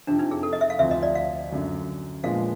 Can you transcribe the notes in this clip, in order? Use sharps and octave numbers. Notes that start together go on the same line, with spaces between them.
F2 C3 F3 D4
D#4
G#4
A4
D#5
E5
F5
D2 C3 F3 E5
D#5
D5
F5
F#2 D3 F#3
A#2 F3 G#3 B3 D4 F5